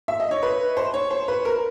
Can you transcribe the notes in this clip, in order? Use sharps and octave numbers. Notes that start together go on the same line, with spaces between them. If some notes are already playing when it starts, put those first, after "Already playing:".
E5
D#5
C#5
B4
C5
C#5
C5
B4
A#4